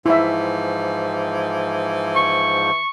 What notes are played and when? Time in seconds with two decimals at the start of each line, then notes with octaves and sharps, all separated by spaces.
0.06 G#2 E3 F3 E4 E5
2.16 C#6